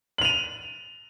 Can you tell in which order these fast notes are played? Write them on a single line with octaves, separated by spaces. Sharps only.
F#7 F7 D#7